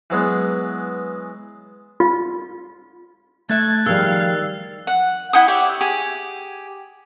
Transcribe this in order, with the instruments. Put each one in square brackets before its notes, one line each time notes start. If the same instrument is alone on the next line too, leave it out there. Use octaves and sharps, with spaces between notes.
[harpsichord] E3 F#3 G#3 B3
[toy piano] F4
[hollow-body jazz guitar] A3 A4 E5 [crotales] F#6 A6 [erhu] G#6
[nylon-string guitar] D#3 G3 [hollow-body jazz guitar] F3 G#4 [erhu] F5 [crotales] E6
[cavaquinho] F#5
E4 F#5 G5 D#6
G4 C#5 D5 E5
G4 G#4